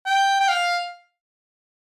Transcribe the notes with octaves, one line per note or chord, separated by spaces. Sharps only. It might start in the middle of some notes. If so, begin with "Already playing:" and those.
G5
G5
F5